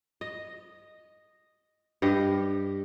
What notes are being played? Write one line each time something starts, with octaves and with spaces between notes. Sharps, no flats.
D#5
G2 G4 D#5